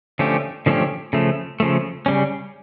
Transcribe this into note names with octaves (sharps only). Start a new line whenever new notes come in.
D3 F3 A3 C#4 G4
D3 F3 A3 C#4 G4
C#3 F3 A3
C#3 F3 A3
C#3 G3 C#4